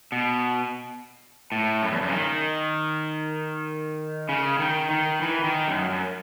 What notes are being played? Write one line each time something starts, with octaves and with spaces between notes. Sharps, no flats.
B2
A2
F#2
E2
F#2
C#3
D#3
C#3
D#3
D#3
E3
D#3
F#2
F#2